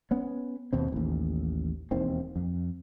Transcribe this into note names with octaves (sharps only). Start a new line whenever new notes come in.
B3 C#4
D#2 B2 C4
A1 D#2
E1 D#2 D#3 C4
F2